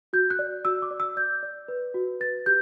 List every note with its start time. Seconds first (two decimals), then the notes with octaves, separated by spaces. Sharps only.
0.13 F#4 G6
0.30 F#6
0.39 D5
0.65 F#4 E6
0.82 D6
0.91 D5
1.00 E6
1.16 D5 G6
1.43 D5
1.68 B4
1.94 F#4
2.20 B4 A6
2.46 G4 G6